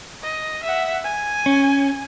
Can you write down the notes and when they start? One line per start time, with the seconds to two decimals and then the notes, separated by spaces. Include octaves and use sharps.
0.22 D#5
0.64 E5 F#5
1.04 G#5
1.46 C#4